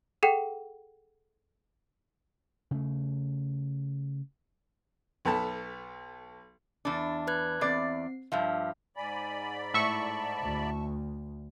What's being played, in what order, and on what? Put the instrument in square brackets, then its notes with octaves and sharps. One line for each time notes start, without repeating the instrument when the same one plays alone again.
[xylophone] G#4 A4 F#5 G5
[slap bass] C#3 A3
[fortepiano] B1 B3 A4 A5 B5
[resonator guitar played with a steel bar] E2 D4
[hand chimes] B4 F#6 G#6
[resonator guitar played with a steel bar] E2 D5 [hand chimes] C4 C7
[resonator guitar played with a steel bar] G2 F3 [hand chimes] E5 F5 F6
[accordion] G#2 D5 B5 [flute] G#5
[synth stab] A2 E5 C#6 [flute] A5
[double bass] D2